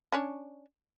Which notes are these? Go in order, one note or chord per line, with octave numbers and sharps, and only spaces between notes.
C#4 D4 C#5